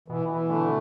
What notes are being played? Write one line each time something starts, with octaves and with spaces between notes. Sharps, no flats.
B2 E3
E3
D3 A3